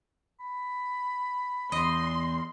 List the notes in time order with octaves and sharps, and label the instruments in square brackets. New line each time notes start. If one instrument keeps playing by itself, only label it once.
[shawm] B5
[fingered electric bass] E2 [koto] D#5 [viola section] C6